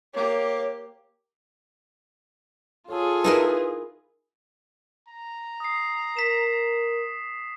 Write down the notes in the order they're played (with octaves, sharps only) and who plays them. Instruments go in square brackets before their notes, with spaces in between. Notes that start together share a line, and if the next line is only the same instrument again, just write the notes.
[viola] A#3 G4 [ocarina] C#5
[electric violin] F4 G#4 [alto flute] A4 [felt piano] C#5
[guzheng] D#4 E4 A#4 [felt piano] B4
[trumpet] A#5
[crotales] D#6 C7
[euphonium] A#4 [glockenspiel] B6 E7